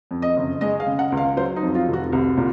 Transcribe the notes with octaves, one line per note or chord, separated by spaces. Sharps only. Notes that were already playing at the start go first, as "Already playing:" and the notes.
F2
D#5
F#1
G#3 D#5
F5
C#3
F#5
C#2
F5
F#3 C5
D#4
F2
F4
F1
F#4
C2
A#2